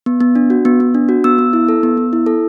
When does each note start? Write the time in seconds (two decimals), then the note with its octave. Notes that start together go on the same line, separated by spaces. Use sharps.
0.06 B3
0.20 B3
0.36 D4
0.50 F#4
0.65 B3
0.80 B3
0.94 D4
1.09 F#4
1.24 B3 E6
1.38 B3
1.53 E4
1.69 A4
1.83 B3
1.97 B3
2.13 E4
2.26 A4